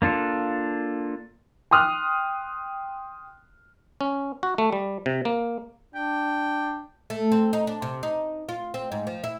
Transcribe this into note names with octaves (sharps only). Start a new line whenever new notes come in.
A#3 D4 F4 A4
G5 C6 D#6 F6 F#6
C#4
F#4
A3
G3
C3
A#3
D4 G5
A3
C4
D#4
D4
C3
D#4
F4
C4
G#2
F3
E4